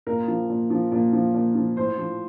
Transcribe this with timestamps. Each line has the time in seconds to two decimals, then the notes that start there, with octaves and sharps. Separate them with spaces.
0.06 A#2 A#4
0.28 F3
0.50 A#2
0.70 F3
0.92 A#2
1.13 F3
1.34 A#2
1.55 F3
1.76 A2 C5
1.97 F3